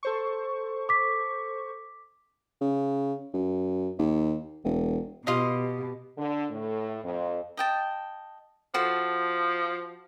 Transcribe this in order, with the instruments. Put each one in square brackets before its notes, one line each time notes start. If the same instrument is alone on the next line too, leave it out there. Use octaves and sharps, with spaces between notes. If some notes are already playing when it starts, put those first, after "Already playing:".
[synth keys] A4 C5 C#6
[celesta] D6 B6
[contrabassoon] C#3
F#2
D#2
E1
[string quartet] B2 [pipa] F4 D#5 [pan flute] G4
[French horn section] D3
A2
F2
[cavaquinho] D#5 G5 A5
[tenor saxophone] F3 [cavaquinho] F#4 A4 C6